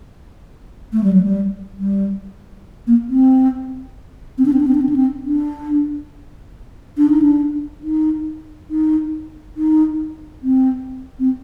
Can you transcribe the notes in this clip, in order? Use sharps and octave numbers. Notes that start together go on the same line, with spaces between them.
A3
G3
F#3
G3
G3
A#3
C4
C4
D4
C4
D4
C4
D4
C4
D4
C4
D4
D4
D#4
D4
D#4
D#4
D#4
C4
C4